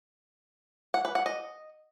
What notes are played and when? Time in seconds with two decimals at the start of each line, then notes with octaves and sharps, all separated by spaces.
0.94 F#5
1.05 B4
1.15 F#5
1.26 D#5